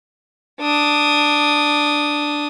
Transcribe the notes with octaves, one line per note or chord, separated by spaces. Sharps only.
D4 D#6